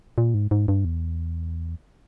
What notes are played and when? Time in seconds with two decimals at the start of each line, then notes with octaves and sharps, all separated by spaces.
0.18 A#2
0.34 G#2
0.51 G#2
0.68 G2
0.85 E2